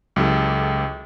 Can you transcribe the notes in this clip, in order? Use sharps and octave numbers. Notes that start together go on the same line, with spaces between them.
C#2 F#3 E4 G4 A4